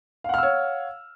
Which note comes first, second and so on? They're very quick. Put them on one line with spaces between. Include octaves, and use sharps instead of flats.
F5 F#5 F6 E6 C#5